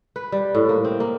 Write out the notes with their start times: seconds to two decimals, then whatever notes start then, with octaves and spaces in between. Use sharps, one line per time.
0.16 B4
0.32 G3
0.55 A2
0.69 A#3
0.85 C4
1.00 A#3